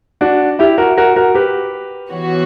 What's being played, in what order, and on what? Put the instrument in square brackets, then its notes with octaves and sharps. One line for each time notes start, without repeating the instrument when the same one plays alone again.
[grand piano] D4 F#4
E4 G4
F#4 A#4
F#4 A#4
F#4 A#4
G4 B4
[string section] E3 B3 F#4 C#5